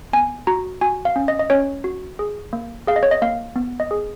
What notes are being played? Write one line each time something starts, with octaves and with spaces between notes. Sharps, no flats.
B3 G#5
F#4 A#5
F#4 G#5
F5
C#4
D#5
D#5
C#4 C#5
F#4
G#4
A#3
G#4 F5
D#5
C#5
D#5
A#3 F5
B3
D#5
G#4